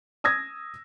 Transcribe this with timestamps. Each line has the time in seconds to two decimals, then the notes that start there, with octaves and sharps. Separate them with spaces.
0.24 D#6 E6 G#6 A#6